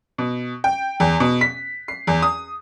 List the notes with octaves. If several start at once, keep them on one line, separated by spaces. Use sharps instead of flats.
B2
G5
E2
B2
B6
C7
E2
D#6